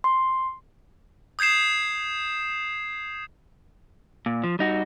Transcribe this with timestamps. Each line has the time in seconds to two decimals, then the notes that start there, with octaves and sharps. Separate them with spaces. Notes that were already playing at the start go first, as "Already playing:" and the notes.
0.04 C6
1.39 D#6 G6 G#6 C7 E7
4.26 A#2
4.44 F3
4.59 G3 D#4 F#4